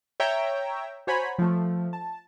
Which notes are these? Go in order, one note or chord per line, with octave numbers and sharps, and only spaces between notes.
C#5 E5 G5 A#5
F#4 C5 C#5 G#5 A#5 B5
F3 A3
A5